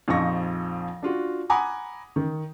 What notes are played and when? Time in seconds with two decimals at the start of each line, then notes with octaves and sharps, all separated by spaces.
0.08 A#1 F2 F3 D#4 C#6 A#6
1.02 D4 F4 F#4
1.50 F#5 G#5 A#5 B5 D6 D#6
2.16 D#3